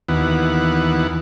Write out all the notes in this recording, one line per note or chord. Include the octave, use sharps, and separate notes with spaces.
D#2 E3 B3 F#5